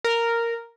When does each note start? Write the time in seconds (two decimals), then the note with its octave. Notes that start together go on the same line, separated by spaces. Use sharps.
0.05 A#4